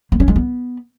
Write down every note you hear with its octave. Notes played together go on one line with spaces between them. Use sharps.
A#3
C#4
G#3
B3